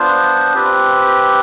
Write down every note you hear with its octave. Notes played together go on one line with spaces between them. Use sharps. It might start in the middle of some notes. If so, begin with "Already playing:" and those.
Already playing: B3 D4 F4 C5
C4 G4 B4